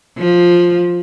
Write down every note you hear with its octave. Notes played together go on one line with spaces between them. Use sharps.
F3